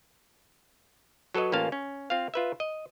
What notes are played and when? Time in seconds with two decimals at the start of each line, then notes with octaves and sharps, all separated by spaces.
1.34 F#3 A4 B4 C#5 D#5
1.52 A1 A#3 C#4 F4 F5 A5
1.72 C#4
2.10 C4 F4 F5
2.34 F4 B4 E5
2.60 D#5